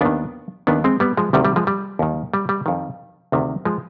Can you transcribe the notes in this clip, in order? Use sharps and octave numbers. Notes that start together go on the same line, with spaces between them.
D#2 D#3 B3 D4
D#2 D#3 B3 D4
G#3 C4
G3 B3
F3 G#3
D2 C3 D#3 G3
G3
F3 G#3
G3
D#2 D#3
G3
G3
F2 D#3
D2 C3 D#3
F3 G#3